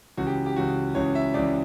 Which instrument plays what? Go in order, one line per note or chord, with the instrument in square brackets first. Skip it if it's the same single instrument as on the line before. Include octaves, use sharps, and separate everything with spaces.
[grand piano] C#2 C#3 E3 F#4
G4
G4
C#2 C#3 E3 F#4
C#2 C#3 E3 C#5
E5
C#2 C#3 E3 D5